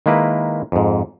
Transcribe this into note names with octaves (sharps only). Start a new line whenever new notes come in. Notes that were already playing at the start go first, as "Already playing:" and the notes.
D#3 G#3 A#3 E4 B4
F2 G#2